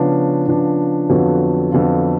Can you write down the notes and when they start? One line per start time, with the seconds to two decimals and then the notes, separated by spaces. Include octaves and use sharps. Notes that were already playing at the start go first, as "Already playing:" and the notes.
Already playing: C#3 F3 B3 D4
0.47 C#3 F3 B3 D4
1.09 F2 D3 F#3 B3 F4
1.72 F2 D3 F#3 B3 F4